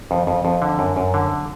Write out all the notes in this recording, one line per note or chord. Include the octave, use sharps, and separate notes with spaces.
F2
F2
F2
D3
F#2
F#2
D3